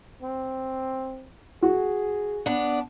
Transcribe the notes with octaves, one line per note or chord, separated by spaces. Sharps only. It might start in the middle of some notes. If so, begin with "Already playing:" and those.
C4
F#4 G#4
B3 D4